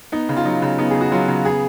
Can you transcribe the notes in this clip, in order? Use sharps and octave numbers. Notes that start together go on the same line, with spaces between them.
B3 D#4
C#3
F4
F#3 D#4
C#3
B3 D#4
C#3 G#4
F#4
F#3 F4
C#3
B3 G#4